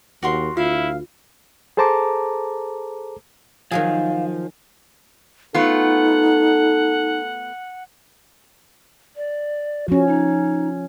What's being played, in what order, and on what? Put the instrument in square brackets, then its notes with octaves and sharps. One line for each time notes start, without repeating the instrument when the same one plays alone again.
[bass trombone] D#2 [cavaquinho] F#4 A#4 C6
[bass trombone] D2 [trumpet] E4 [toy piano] F4 [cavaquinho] F5
[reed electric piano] G#4 A4 C5 A5 A#5 D6
[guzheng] D#3 F#3 G#4 [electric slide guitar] F3 [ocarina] F5
[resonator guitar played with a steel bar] A3 B3 F4 [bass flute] D#4 [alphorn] A4 [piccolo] F#5
[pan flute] D5
[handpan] F3 C#4 [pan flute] F#4
[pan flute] D#4